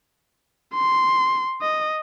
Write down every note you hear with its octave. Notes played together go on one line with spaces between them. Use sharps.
C6
D#5